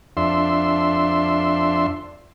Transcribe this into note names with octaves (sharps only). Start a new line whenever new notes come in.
F2 D4 E5 C6